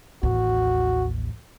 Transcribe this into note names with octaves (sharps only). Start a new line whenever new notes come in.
A1 D#2 F#4